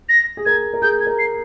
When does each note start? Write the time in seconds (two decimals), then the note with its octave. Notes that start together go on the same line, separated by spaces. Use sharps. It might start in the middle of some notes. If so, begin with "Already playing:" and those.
0.09 A#6
0.37 G#4
0.46 A#4 G#6
0.73 A#4
0.82 G#4 G6
1.00 G#6
1.07 A#4
1.19 C7